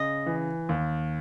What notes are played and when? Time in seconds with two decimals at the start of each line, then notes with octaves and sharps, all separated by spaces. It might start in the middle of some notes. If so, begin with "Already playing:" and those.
Already playing: C#3 D#5
0.26 E3
0.69 D#2